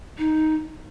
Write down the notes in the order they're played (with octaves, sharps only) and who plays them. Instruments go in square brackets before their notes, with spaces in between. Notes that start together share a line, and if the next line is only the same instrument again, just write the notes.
[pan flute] D#4